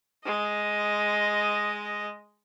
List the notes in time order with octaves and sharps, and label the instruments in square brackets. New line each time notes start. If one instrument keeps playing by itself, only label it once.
[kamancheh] G#3 D#5